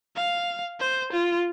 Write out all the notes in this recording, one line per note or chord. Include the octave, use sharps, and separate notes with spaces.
F5
C5
F4